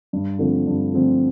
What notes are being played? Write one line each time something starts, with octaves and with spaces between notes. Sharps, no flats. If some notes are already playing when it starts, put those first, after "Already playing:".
G2
D3 F3 A3 C4
G2
D3 F3 A3 C4